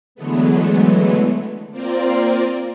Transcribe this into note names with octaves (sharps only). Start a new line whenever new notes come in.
D3 E3 F#3 G#3 A3 B3
A#3 C4 F4 A#4 C5 D5